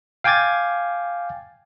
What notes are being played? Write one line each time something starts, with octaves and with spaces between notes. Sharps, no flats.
F5 G5 G#5 D6 G#6 A6